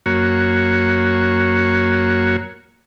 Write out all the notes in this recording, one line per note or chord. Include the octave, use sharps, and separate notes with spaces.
F#2 A#3 F#4 C#5